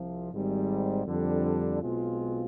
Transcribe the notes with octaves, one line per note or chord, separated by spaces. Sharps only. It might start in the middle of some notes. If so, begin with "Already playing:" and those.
Already playing: C2 C3 F3
G#1 G#2 G3
F2 D3 G3 D4
B1 B2 G#3 C4 F4